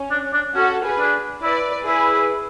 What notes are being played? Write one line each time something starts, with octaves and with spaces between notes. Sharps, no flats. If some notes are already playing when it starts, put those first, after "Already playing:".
Already playing: C#4
D4
D4
C#4 F#4 A4
G#4 B4
D4
E4 B4 D5
E4 G#4 B4